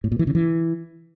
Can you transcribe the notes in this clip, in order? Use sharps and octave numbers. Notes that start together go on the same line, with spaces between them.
A2
A#2
E3
C#3
E3